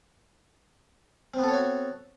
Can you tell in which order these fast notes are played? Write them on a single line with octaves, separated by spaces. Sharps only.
C4 B3 A4 C#5 F#4